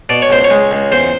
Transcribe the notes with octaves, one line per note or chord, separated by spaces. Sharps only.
B2 D5
C#5
C#2 C5
C#5
G#3
C#2
E2 C5